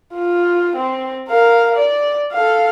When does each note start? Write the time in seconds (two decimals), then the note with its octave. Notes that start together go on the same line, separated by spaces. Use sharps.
0.14 F4
0.76 C4
1.28 A#4 F5
1.76 D5
2.33 A4 F5